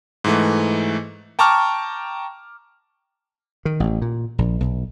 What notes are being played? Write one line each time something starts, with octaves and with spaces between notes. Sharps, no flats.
G#2 E3 A3
G5 A5 A#5 C#6 D6 F6
D#3
A1
A#2
A#1
B1